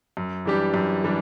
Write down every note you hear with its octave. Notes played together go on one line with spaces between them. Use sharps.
F#2
E3 G3 D4 G4
F#2
E3 G3 D4